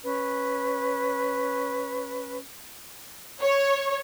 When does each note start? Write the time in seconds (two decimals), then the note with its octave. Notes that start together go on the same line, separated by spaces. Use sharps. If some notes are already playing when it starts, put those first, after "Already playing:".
0.03 C#4 B4
3.42 C#5